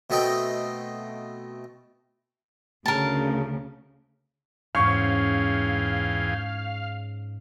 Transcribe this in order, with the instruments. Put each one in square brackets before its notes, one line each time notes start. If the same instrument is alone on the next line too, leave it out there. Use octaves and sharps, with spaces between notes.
[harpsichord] B2 A3 C4 D#5 G5
[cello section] D2 C#3 [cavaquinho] A#4 A5
[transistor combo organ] E2 G#4 G5 [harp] G#2 C#4 [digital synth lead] F5 [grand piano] C#6